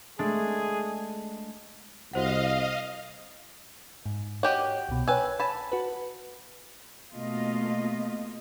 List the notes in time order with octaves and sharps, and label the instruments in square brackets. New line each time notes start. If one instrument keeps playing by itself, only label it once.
[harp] G#3 A3 D4 [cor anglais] G#4
[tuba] C2 [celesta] F#4 C5 F#5 [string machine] D#5 F5
[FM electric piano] G#2
[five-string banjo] F#4 G4 D#5 [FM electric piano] C#5
[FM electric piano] C2 B2
[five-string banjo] B4 G#5 [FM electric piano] C#5 G5 E6
[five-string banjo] G#5 A5 [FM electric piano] B5
[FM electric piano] F#4 B4
[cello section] B2 A3 A#3 F4 D#5